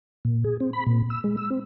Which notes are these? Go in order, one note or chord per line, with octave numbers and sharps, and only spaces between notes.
A#2
G#4
C4
B5
A#2
E6
G#3
E6
C4